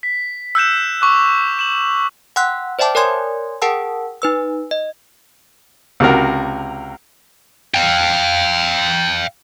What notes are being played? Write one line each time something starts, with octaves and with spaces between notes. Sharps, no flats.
B6
E6 F#6 G6 E7
C#6 D6 F#6
E7 F#7
F#5 G5 C6 E6 F#6
C5 D5 E5 G5 A5 D6
A#4 C#5 D5 G#5 C6 G#6
G#4 A#4 F#5 G5 A5 E6
D#4 B4 E6
D#5
C#2 C3 F#4 A#4
F5 G5